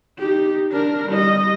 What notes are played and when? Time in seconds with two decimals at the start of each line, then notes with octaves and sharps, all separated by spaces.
0.19 D#4 G4
0.72 D4 A#4
1.09 G3 D#5